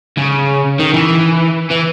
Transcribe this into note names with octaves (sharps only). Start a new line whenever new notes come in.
C#3
D#3
E3
E3